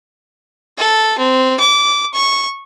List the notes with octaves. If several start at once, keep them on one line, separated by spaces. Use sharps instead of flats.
A4
C4
D6
C#6